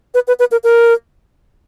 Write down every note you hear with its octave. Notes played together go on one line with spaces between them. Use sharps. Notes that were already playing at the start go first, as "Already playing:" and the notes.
B4
B4
B4
A#4
A#4